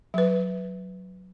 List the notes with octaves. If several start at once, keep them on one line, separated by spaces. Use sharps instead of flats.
F#3 B4